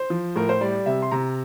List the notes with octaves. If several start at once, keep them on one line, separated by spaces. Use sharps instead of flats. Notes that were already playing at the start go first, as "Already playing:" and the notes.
Already playing: C5
F3
A2 A#4
C5
G3 D5
C3 E5
C6
C3 A#5